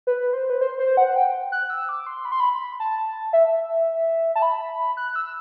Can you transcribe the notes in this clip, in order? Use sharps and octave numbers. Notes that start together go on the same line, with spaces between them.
B4
C5
B4
C5
C5
F#5
G5
F#6
E6
D6
C6
B5
C6
B5
A5
E5
A5
B5
F#6
E6